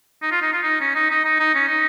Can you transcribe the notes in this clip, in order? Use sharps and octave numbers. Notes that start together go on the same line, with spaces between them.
D#4
F4
D#4
F4
D#4
C#4
D#4
D#4
D#4
D#4
C#4
D#4